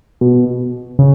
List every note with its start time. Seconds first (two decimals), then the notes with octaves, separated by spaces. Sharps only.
0.21 B2
0.99 C#3